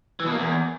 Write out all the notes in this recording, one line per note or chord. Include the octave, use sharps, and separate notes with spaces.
E3
B2
A#3
E2